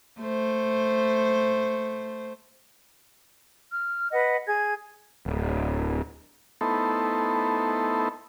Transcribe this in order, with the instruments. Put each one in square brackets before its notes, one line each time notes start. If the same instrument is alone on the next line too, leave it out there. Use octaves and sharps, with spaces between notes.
[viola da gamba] A3 C5
[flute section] F6
B4 D#5 F#5
G#4 G#6
[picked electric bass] D1
[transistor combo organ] A3 B3 D#4 E4 A4 C5